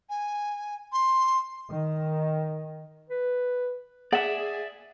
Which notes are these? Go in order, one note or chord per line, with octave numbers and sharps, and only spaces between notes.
G#5
C6
D#3
B4
G#4 D5 E5 F#5